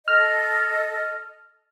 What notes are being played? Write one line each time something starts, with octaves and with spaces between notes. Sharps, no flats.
A4 D#5 F6